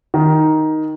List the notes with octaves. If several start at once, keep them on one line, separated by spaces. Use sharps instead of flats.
D#3